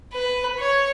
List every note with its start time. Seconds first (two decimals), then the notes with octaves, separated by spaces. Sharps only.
0.13 B4
0.58 C#5